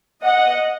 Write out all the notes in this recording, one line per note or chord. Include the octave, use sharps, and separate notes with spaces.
D#5 F#5